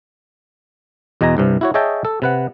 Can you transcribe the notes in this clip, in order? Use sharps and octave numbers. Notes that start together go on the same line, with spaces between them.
E2 B2 D#5 G#5 A#5
C2 G2 C3
E4 F#4 C#5
G#4 C#5 D#5 E5 G5 A5
A4
C3 B4 F#5